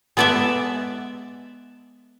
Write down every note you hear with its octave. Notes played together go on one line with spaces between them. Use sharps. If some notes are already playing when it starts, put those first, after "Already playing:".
G#3 B3 A4 D5 E5